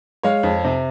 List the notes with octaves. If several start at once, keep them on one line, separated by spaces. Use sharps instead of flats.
G#3 C#5 F5
F2
C3